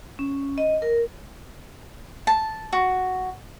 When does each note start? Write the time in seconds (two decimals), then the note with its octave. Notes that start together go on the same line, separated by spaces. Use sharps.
0.19 C#4
0.58 D#5
0.82 A#4
2.27 A5
2.73 F#4